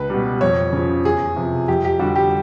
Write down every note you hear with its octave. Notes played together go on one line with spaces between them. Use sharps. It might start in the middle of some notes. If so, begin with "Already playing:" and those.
Already playing: C#2 B4
B2 G3
F2 C#5
C#3 F3
E2 G#4
C3 F3
F2 G4
G4
D3 G3 F#4
G4